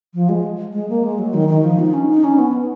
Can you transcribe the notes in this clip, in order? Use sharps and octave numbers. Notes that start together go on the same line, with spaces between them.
F3
G#3
G#3
A#3
G#3
F#3
D#3
D#3
F3
D#4
C#4
D#4
C#4
B3